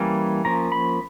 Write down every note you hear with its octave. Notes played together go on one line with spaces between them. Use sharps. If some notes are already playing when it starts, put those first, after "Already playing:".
Already playing: E3 G3 A#3 C#4
F3 A#3 C#4 A#5
B5